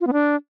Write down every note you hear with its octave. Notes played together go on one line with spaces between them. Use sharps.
F4
B3
D4